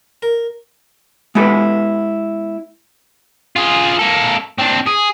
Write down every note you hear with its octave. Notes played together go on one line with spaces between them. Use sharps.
A#4
G#3 B3 E4 G4 A4 B4
F4 G#4
A#3 A4
C4 D4
G#4